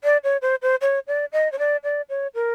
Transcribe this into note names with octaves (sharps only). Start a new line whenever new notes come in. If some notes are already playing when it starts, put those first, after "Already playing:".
D5
C#5
C5
C5
C#5
D5
D#5
C#5
D5
D5
C#5
A#4